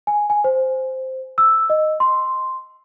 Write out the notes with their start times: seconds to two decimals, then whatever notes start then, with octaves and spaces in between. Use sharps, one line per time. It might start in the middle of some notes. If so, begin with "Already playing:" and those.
0.07 G#5
0.30 G#5
0.44 C5
1.38 E6
1.70 D#5
2.00 C6